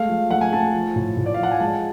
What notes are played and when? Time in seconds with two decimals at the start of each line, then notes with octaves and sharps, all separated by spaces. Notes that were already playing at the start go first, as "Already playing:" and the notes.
Already playing: G#3 A3 F5
0.09 F3
0.31 A3 F#5
0.41 G#5
0.52 A3 A5
0.74 F3
0.96 A2
1.17 A2
1.26 D5
1.34 F5
1.38 F3 F#5
1.51 G#5
1.60 G#3 A5